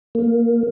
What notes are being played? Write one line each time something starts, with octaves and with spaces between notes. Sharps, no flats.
A#3